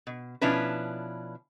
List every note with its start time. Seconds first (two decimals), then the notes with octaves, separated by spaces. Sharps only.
0.07 B2
0.41 B2 F3 C#4 D4 E4 B4